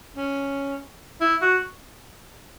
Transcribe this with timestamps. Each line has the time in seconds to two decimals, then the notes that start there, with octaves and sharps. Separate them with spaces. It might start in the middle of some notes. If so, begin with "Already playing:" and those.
0.17 C#4
1.21 E4
1.42 F#4